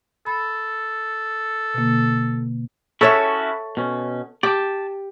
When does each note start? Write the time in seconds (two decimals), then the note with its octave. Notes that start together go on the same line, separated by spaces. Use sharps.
0.26 A4 B5
1.74 B2 D3 A#3
3.01 C#4 E4 F#4 A4 C#5 E5
3.77 B2 C#4
4.43 G4 D5 A5